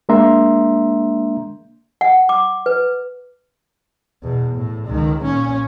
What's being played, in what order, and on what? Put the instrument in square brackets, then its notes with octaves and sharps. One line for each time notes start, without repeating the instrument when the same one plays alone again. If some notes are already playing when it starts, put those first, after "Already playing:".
[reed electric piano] G#3 A#3 D4 E5 A#5 C6
[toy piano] F#5
D6
B4
[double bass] E2 B2
A2
C#2 D#3
A#2 C#4